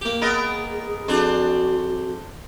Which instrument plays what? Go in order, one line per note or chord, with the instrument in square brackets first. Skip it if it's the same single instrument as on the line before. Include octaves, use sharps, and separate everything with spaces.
[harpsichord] A#3 G4
[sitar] B3 A#4 D#5 [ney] G#4
[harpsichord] F2 G#4 [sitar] D4 C5 [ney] F#4